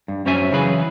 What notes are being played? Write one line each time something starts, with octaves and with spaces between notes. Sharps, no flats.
G2
F#2 C#4 C5 C#5 E5 G#5
C#3 E3 F#3 G#4 B4